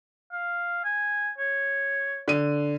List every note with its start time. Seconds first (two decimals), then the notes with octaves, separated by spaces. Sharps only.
0.32 F5
0.84 G#5
1.38 C#5
2.28 D3 D#7